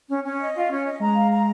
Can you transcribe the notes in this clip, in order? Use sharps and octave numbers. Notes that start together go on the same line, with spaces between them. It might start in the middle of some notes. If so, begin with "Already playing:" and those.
C#4
C#4
D#5
F4
C#4
D#5
G#3 A#5
F5
A#5